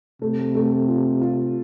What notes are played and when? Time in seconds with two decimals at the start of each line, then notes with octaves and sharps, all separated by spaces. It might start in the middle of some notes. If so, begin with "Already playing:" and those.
0.22 C3 A3
0.55 A3
0.88 F4
1.22 F4